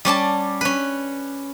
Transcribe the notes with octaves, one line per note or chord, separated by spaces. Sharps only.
G3 C#4 D5 A5
C#4 B4